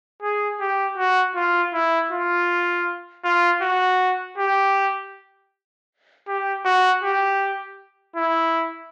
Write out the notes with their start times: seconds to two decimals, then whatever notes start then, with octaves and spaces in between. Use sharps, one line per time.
0.22 G#4
0.60 G4
0.98 F#4
1.36 F4
1.74 E4
2.11 F4
3.24 F4
3.62 F#4
4.38 G4
6.28 G4
6.65 F#4
7.03 G4
8.16 E4